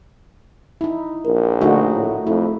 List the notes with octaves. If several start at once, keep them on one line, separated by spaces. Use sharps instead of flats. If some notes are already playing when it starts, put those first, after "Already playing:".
D#4 E4
A#1 A#4
D3 A3 D#4 F#4
A2
F2 A3 E4